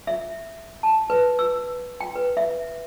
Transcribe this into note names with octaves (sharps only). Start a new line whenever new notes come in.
E5
A5
B4
E6
G5
B4
E5